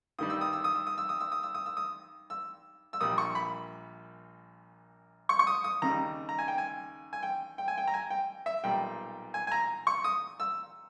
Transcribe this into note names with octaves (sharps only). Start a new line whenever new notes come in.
G2 D#3 G3 D#6
E6
D#6
E6
D#6
E6
D#6
E6
D#6
E6
D#6
E6
D#6
E6
D#6
E6
E6
A#1 A#2 G3 D#6
C#6
B5
C#6
C#6
D#6
D#6
D#2 C#3 G3 A#5
A#5
G#5
G5
G#5
G#5
G5
G5
G#5
G5
A#5
G#5
G5
E5
B1 A#2 G3 G5
G#5
G#5
A#5
C#6
D#6
E6